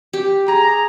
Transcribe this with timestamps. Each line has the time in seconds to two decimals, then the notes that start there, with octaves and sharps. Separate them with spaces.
0.13 G4
0.48 G#4 A#5